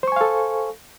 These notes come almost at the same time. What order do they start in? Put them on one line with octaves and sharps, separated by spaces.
C5 C#6 G#5 F5 A4